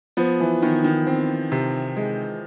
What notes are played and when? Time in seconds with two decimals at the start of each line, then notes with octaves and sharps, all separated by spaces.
0.17 F3 B3
0.40 E3
0.62 D#3 B3
0.84 D#3
1.07 C4
1.52 C3
1.97 G#3